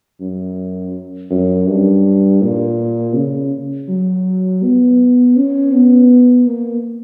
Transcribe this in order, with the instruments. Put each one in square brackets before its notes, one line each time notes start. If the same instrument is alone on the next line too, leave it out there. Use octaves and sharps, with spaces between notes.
[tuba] F#2
F#2
G2
A#2
C#3
F#3
B3
C#4
B3
A#3